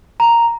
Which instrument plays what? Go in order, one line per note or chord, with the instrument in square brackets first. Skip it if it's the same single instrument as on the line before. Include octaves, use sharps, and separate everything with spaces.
[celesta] A#5